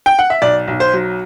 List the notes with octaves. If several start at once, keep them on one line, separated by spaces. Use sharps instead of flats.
G5
F#5
E5
B1 D5
B1
C5
F#3